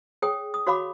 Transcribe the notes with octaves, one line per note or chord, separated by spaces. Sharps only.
G#4 C#5 G5 D#6
D#6
F#4 C#5 F5 B5 D6